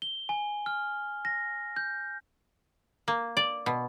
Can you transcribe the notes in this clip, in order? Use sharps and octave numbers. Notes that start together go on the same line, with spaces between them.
G7
G#5
F6
A#6
G6
A#3
D5
B2